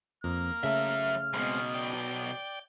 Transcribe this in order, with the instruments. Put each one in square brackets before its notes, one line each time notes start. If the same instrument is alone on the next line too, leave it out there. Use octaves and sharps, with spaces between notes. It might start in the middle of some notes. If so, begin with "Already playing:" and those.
[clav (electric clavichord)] F2 [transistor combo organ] A#3 [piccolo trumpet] F6
[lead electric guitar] F#2 E5 [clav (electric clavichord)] C#3 A3 A4
[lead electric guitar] B1 B2 [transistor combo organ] G#3 C4
[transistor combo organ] D5 G5